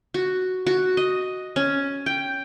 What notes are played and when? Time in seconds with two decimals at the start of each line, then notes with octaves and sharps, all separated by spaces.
0.14 F#4
0.67 F#4
0.97 D#5
1.56 C#4
2.06 G5